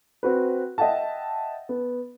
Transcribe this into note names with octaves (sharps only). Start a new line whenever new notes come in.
C4 F#4 B4
D#5 E5 F#5 G5 A5
B3